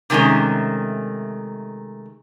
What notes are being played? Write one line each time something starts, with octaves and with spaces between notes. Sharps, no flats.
C3 D#3 G#3 A3 C#4